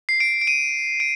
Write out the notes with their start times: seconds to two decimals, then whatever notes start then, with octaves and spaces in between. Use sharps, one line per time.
0.09 C7
0.20 D7
0.41 D7
0.47 D#7
1.00 D7